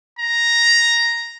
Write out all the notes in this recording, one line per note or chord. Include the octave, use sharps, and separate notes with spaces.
A#5